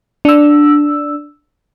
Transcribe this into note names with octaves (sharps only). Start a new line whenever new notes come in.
D4 E6